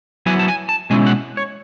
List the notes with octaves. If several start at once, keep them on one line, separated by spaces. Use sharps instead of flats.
F#3 B3 E4 G#5
A5
G#5
A5
B2 G#3 C#4 E4 G#5
F#5
C#5